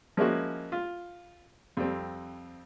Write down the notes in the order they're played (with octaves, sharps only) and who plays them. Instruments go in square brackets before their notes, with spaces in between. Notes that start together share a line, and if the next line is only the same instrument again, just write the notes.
[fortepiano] F3 G#3 A#3 C#4 E4 F#4
F4
F2 G3 C4